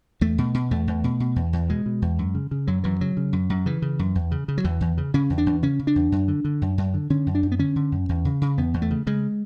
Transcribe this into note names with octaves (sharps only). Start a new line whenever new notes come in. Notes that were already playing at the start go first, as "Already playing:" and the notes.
E2 A3
B2
B2
E2 A3
E2
B2
B2
E2
E2
B2 G#3
B2
E2
F#2
C#3
C#3
F#2 F#3
F#2 E3
C#3 F#3
C#3
F#2
F#2
C#3 E3
C#3
F#2
E2
C#3
C#3
F#3
E2 E3
E2
C#3
C#3 C#4
E2
D4
E2
C#3 C#4
C#3
D4
E2
F#2
D3
D3
F#2
F#2
D3
D3 C#4
F#2
D4
F#2
B3
D3 C#4
D3
F#2
E2
C#3
C#3
E2 B3
E2
A3
C#3
C#3 G#3